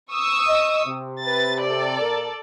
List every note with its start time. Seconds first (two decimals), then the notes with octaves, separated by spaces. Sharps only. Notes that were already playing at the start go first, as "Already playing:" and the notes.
0.13 C#6 D#6 E6
0.48 D#5
0.86 C3
1.22 B4 A6
1.63 A4 D5
2.01 A#2 A#4